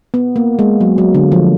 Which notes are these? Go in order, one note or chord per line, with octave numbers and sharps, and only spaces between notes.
B3
A#3
G#3
F#3
F#3
D3
F3